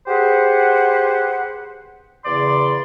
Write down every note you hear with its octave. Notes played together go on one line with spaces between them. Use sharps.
G4 G#4 B4 C5 F#5
E2 C#3 D5 C6